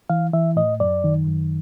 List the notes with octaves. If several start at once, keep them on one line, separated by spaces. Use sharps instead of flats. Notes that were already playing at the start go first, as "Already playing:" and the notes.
E3 F5
E3 E5
A2 D#5
F#2 D5
D#3
F#2